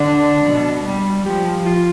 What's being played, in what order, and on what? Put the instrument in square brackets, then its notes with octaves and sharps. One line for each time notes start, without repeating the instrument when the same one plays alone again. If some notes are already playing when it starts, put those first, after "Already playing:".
Already playing: [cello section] D3 [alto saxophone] D4
[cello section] B2
G3
[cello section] F3 [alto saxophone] G4
[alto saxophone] F4